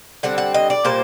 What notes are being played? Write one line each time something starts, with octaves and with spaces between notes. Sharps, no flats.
D3 G3 C4 F#5
F#5
D#5
D5
A#2 G3 A#3 C5